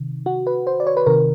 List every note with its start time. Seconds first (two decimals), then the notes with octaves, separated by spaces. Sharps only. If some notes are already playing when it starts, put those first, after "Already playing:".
Already playing: C3 D#3
0.26 F#4
0.47 B4
0.67 C5
0.80 D5
0.87 C#5
0.97 B4
1.06 C3 D#3 A#4